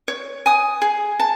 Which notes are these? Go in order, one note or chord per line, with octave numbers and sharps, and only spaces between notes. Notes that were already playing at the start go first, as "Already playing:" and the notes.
C#5
G#5 D#6
G#4
A5